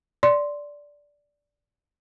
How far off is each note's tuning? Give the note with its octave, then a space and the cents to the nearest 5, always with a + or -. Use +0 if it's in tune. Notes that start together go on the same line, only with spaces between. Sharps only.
D5 -10 C6 +0